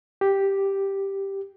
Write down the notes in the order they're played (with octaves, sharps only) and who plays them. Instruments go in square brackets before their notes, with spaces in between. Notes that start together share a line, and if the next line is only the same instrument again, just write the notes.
[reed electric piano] G4